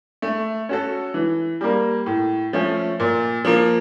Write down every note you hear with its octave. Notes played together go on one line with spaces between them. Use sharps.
A3
C#4 F#4 A4
E3
G3 A#3
A2
F3 A3 C#4
A#2
F3 A#3